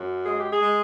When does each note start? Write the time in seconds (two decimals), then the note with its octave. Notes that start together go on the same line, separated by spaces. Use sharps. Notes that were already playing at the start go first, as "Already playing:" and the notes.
Already playing: F#2
0.26 G#3 G#4
0.40 G4
0.53 G#4
0.60 G#3